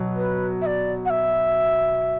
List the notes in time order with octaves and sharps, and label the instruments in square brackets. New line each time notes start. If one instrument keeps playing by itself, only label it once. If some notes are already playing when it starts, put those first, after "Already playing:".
Already playing: [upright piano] B2 F#3
[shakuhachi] B4
E5
D5
F#5
E5